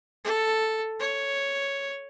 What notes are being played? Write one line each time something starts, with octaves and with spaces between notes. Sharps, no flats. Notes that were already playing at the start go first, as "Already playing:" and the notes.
A4
C#5